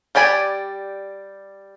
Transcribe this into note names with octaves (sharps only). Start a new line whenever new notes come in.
G3 G4 D5 G#5 B5